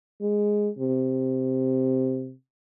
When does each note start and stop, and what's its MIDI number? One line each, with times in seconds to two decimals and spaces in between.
0.21 0.69 56
0.79 2.34 48